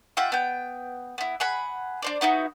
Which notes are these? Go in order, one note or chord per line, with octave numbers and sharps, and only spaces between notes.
F4 G4 E5 F#5
B3 G5
B3 E4
G#4 F#5 B5
D4 C5 D5
B3 D#4 E4 F#4